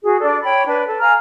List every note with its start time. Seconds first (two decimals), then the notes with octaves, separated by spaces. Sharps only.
0.03 F#4 G#4
0.20 D4 A4 D5
0.44 C#5 G5 B5
0.66 D4 B4
0.87 A4
1.01 F5 G#5 A#5 F6